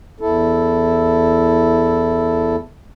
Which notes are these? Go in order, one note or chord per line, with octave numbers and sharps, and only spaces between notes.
E2 E4 A4